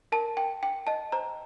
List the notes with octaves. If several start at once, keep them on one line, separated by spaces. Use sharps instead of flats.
A#4 A5
G5
G5
D#5 A5
C5 A#5